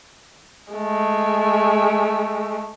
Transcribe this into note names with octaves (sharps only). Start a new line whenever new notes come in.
G#3 A3